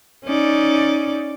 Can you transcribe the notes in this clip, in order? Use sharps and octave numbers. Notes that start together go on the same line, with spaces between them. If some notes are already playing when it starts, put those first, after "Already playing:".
C#4 D#4 D5